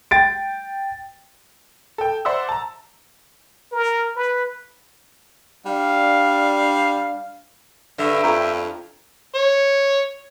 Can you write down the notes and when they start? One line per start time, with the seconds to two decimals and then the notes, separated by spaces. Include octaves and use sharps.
0.11 G5 A6 D7
1.98 A4 G5
2.25 C5 D5 E5 F#5 E6
2.49 A5 A#5
3.72 A#4
4.16 B4
5.66 G3 D4 F5
7.98 G2 D3 E5
8.23 F2 A#5
9.35 C#5